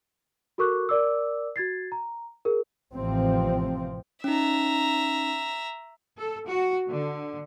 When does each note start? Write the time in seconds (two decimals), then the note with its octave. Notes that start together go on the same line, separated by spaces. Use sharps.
0.58 F#4 A4 A#4 C#6 D6 F#6
0.89 A#4 D5 D6 E6
1.56 F#4 G#6 A6 C7
1.92 A#5
2.45 G#4 A#4
2.93 A1 C3 E3 F3 C4
4.24 C#4 D#4 E5 A#5
6.18 A4
6.48 F#4
6.91 D3